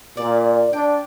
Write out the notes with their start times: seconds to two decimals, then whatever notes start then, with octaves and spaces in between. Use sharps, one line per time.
0.17 A#2 D5
0.73 D4 G5